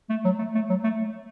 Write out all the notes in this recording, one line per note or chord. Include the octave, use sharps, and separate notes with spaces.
A3
F#3
A3
A3
F#3
A3